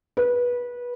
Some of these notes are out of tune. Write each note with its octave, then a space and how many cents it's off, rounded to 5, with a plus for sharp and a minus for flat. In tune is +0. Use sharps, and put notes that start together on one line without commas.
B4 -20